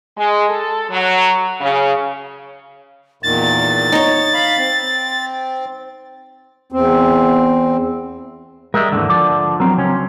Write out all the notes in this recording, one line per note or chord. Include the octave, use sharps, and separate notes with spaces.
G#3
A4
F#3
C#3
E2 A#2 D#3 A6
D#4 C#5
F5 B5
C4
E2 C4
G3 G#3 A#4 E5
D#2 G#2 D3 E3
F3 D4 D5
F#3 C4 A#4
C#2 C#4